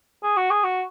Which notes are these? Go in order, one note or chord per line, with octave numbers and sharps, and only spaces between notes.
G#4
F#4
G#4
F#4